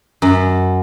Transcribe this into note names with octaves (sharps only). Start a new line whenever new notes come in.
F#2